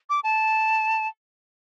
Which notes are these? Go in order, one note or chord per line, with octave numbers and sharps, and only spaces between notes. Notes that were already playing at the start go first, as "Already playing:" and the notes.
D6
A5